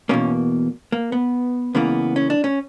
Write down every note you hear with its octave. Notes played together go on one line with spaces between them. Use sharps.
E2 B2 A#3 C#4
A#3
B3
C#2 C#3 E3 A#3 B3
C#4
D4
C#4